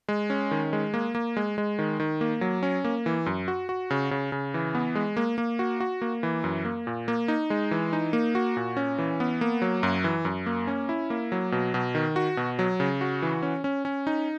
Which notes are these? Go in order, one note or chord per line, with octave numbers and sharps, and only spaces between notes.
G#3
C#4
D#3
G#3
A#3
A#3
G#3
G#3
D#3
D#3
A#3
F#3
C#4
A#3
E3
F#2
F#4
F#4
C#3
C#3
C#3
E3
B3
G#3
A#3
A#3
F#4
F#4
A#3
E3
F#2
A#3
A#2
A#3
D#4
G#3
E3
D#4
A#3
F#4
A#2
C#4
E3
B3
A#3
F#3
F#2
E3
F#2
A#3
C#4
E4
A#3
F#3
B2
B2
D#3
F#4
B2
F#3
C#3
F#4
E3
C#4
C#4
C#4
D#4